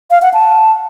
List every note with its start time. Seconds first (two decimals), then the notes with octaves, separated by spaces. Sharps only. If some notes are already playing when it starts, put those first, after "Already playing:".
0.11 F5
0.22 F#5
0.34 A5